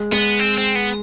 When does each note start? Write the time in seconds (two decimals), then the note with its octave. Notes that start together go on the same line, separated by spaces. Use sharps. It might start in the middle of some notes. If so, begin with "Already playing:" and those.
Already playing: G#3
0.12 G#3 B3
0.39 C4
0.58 C4
0.75 B3